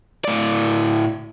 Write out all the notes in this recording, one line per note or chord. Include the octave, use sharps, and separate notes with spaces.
A2 D5